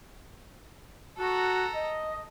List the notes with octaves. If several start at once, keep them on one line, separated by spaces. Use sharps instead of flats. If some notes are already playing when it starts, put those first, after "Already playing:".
F#4 A4 A#5
D#5